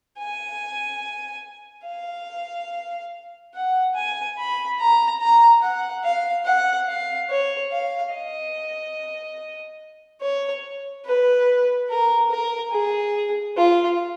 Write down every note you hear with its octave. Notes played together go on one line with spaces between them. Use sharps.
G#5
F5
F#5
G#5
B5
A#5
A#5
F#5
F5
F#5
F5
C#5
F5
D#5
C#5
B4
A#4
A#4
G#4
F4